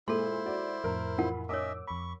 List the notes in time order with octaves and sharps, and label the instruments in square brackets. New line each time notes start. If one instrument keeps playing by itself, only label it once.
[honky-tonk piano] A#2 [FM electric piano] G#3 [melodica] E4 C5 [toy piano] A4 C6
[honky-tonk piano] F#4 D5
[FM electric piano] F2 A2 [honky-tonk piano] A#4
[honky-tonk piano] E3 F4 B5 [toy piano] A#4 F#5
[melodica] C#4 D#5 E5 [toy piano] A#4 C#5 [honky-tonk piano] D6 E6
[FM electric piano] F2 B5 [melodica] C#6